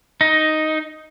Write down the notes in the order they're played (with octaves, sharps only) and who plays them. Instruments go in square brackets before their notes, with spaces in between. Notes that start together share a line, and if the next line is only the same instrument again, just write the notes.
[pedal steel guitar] D#4